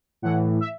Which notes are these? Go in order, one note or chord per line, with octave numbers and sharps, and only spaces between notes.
A2 E3 F#5
E5